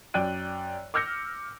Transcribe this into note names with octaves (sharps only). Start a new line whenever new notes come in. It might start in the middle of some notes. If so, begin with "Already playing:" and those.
F#2 D5 G5 F#6 D#7
D6 E6 F6 G6 A#6 C#7